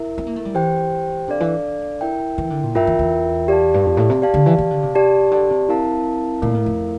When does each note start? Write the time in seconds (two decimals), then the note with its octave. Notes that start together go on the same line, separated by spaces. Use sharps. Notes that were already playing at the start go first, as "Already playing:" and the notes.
Already playing: E4 A#4 E5
0.18 C4
0.27 A#3
0.36 A3
0.45 G3
0.54 E3 G4 C5 G5
1.27 C3 D4 A4 D5 F5
1.40 E3
2.01 E4 A#4 E5 G5
2.38 E3
2.50 D3
2.63 A#2
2.75 G2 F4 A#4 E5 G5
2.87 E2
2.99 E2
3.48 G4 D5 F5 A5
3.74 G2
3.86 F2
3.97 A2
4.10 C3
4.22 G4 D5 F5 A5
4.34 D3
4.46 E3
4.58 E3
4.71 D3
4.83 C3
4.95 G4 D5 A5
5.31 D3
5.50 C3
5.69 C4 E4 A#4 F5 A5
6.42 A#2 A3 E4 A#4 F5
6.55 A2
6.66 F2